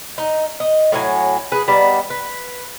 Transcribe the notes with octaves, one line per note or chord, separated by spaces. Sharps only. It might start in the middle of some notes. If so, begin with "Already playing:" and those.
D#4
D#5
A2 F#3 G#5
G#4 B4
G3 B3 D#4 D5
B4